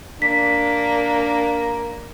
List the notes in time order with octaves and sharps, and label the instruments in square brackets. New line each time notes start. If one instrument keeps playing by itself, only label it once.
[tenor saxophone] A#3 [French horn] D4 [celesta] B6